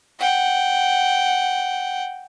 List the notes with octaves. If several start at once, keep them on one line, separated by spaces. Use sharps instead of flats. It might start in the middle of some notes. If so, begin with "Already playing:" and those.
F#5 G5